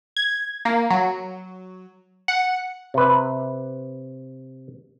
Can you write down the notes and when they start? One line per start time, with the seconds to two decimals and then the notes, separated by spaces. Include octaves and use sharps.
0.17 G#6
0.65 A#3
0.90 F#3
2.28 F#5
2.94 C3 B4